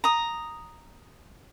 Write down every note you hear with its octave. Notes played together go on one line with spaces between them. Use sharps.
A#5 D#6